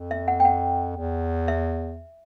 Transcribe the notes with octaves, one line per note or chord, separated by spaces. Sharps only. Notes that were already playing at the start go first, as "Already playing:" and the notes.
Already playing: F2
E5
F#5
G5
F#5
E2
E5